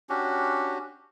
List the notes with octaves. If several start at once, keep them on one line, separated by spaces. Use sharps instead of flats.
C#4 D4 F#4 G4